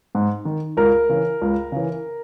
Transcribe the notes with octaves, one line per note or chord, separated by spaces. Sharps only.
G#2
D#3
C#2 A#4
C#3 E3
C#2
C#3 E3